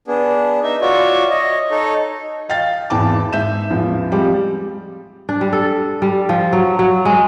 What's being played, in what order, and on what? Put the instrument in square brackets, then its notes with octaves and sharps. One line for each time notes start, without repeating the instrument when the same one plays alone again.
[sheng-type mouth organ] B3 D4 G#4
D#4 E5
F4 F#4 C#5 D5 E5
C#5 D#5
D#4 A4 C#5
[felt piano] D#5 F5 G5 A6
G#1 E2 E3 G5 A5 D6
G#2 E5 G6 E7
A1 E2 F3
F3 G3 G#3 C4 G4
[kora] D4
G3
A4
G3
F3
F#3
F#3
G#3